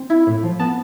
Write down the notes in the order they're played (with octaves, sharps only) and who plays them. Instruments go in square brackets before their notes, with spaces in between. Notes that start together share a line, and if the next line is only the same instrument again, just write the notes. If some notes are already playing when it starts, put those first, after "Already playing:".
Already playing: [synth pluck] C4
E4
A2
F3
B3 A5